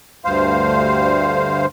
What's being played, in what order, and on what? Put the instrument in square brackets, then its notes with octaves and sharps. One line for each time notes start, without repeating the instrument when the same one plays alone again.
[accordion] D2 G2 C5 F5